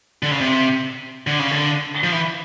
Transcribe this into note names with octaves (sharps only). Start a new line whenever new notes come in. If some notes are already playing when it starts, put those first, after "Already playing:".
D3
C#3
C3
D3
C#3
D3
F3
E3